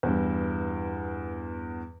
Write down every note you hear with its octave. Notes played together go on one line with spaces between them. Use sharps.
E2 G2